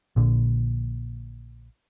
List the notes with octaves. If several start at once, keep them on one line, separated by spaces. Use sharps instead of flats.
A#1 A#2 D3